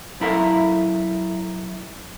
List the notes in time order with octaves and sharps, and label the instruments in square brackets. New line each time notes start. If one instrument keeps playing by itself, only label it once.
[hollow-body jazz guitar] B1 F#2 E4 A4 A#4 F5